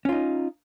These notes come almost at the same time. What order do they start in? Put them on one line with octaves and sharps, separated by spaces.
C#4 F4 D#4